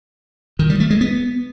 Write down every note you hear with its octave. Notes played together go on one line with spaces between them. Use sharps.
D#3
G3
A3
G#3
B3